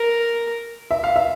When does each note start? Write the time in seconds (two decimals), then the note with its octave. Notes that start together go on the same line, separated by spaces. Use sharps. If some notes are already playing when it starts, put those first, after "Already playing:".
Already playing: A#4
0.91 E5
1.04 F5
1.16 E5